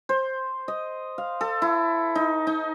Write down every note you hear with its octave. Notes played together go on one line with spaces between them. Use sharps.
C5
D#5
F5
A4
E4
D#4
D#4